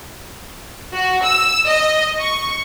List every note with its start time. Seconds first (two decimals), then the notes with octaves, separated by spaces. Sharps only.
0.93 F#4
1.24 E6
1.67 D#5
2.20 C#6